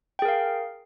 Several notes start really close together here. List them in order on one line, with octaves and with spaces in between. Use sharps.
G5 G#4 A#4 F5